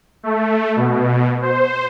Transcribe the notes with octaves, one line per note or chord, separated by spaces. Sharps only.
A3
B2
C5